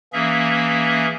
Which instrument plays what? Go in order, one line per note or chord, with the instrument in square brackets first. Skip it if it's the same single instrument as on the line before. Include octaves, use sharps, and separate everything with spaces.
[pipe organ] E3 A#3 C#4 G#4 E5